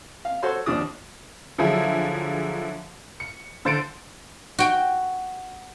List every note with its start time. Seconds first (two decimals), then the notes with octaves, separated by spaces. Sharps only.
0.25 F5
0.43 F#4 A4 C5 C#5 C6
0.66 D#2 F3 D4 D#6
1.58 D3 F3 F#3 E4 G#4
3.20 C#7
3.65 D3 C5 A6 C#7 D7
4.59 F#4 G5